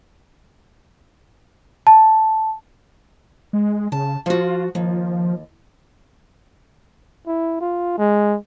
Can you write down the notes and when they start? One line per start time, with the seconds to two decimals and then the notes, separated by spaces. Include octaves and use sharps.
1.87 A5
3.53 G#3
3.92 C#3 A5
4.26 F3 F4 F#4
4.75 D#2 F3
7.27 E4
7.61 F4
7.98 G#3